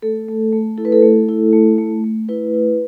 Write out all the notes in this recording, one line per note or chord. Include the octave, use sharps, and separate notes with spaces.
A3 A4
A3
A3
E4 A4
B4
A4
A3
E4
A3
A3
A3
E4 B4
E4